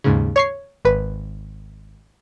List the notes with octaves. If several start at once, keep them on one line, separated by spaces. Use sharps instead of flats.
D#2 G#2 C#3
C#5 C#6 C7
G#1 B4